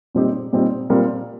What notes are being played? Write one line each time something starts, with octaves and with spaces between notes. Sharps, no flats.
A#2 G3 C4 D#4 G4
A#2 G3 C4 D#4 G4
A#2 G3 C4 F4 A#4